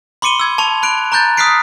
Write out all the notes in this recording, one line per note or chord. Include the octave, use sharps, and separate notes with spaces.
B5 C6 D6 C#7 D#7 G7
E6 G#6
A5 C6 C#6 F7
B5 F#6 D7
A#5 C#6 F#6 G6 A6
D#6 F6 F#6 B6 C7 D7